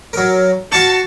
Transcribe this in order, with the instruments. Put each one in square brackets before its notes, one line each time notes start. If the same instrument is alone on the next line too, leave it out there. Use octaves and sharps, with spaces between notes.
[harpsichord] F#3 A#4
[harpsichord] F#4 F5 C#6 [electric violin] A5